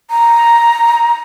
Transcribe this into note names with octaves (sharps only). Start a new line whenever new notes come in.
A#5